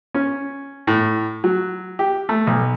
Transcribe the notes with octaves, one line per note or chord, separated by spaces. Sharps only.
C#4
A2
F#3
G4
A3
B1